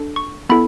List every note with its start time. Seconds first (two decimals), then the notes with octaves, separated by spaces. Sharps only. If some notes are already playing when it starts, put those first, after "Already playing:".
Already playing: D4 A4
0.16 C#6
0.49 B3 E4 A4 B5